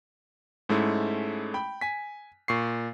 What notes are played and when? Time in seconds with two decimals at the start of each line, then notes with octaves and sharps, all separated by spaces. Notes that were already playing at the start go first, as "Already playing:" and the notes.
0.69 G#2 G#3 A3 C#4 E4
1.54 G5 B5
1.81 G#5 B6
2.48 A#2 C#6 C7